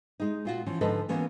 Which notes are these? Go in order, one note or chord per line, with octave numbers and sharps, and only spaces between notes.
G#3 D#4
A#2 F4 F#4
E3 F3 C#4
G#2 D3 F3 A4 B4 D#5
E3 A#3 B3 C#4 F#4